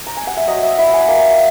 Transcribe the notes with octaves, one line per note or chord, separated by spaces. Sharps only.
A#5
G#5
F#5
E5
F#3 D#5
E5
E4 E5
F#5
G#5
A#3